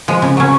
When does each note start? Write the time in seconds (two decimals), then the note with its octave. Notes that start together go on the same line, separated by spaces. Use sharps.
0.08 F3 G#3
0.22 C#3
0.37 F#3 C#4